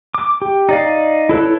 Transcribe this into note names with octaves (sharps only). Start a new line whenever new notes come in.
D6
G4
D#4 D5 F5
E4 A4 B4 C#5